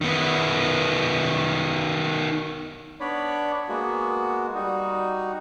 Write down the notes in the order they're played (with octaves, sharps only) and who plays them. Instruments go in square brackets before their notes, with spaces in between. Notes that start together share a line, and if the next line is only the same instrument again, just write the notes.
[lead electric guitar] D#3 B3
[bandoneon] B3 D4 C#5 D5 B5
G#3 A#3 B3 F#4
G3 D#4 F#4